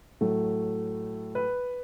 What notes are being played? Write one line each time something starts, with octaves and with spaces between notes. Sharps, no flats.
A2 F#3 A3
B4